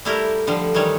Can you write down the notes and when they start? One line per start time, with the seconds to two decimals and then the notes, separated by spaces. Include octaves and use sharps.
0.05 G3 A3 E4 G4 A#4
0.47 D3 F3 G3
0.74 D#3 E3 G3 C#5